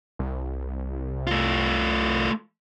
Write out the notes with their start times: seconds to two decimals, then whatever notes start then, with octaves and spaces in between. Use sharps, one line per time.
0.19 C2
1.27 A3 F4